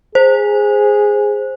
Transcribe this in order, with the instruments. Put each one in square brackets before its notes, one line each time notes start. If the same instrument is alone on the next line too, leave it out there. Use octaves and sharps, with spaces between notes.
[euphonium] G#4 [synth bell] C5